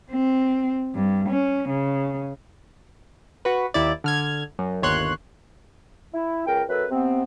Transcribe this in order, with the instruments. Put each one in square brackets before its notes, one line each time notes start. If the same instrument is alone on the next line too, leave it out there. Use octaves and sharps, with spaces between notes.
[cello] C4
G2
C#4
C#3
[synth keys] F#4 B4
D#2 E4 D5
D3 F6 G#6
F#2
G1 D#2 C#5 C6 F#6
[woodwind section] E4
C#2 A#4 G5
F#2 A4 B4
C3 B3 C4